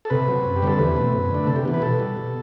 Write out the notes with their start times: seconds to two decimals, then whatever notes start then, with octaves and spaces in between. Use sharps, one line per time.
0.05 A4
0.10 C3 B4
0.28 F#3 C4
0.45 F#2
0.56 G4
0.62 D3 G3 C4 A4
0.78 E2 B4
0.96 B2 A3 C4
1.13 F#2
1.31 D3 A3 D4
1.47 C3 A4
1.56 G4
1.65 E3 B3
1.74 B4
1.82 B2 A4
1.99 G3 B3
2.17 B2